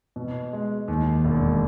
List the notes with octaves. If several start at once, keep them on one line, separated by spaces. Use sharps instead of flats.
B2
G#3
D#2
E1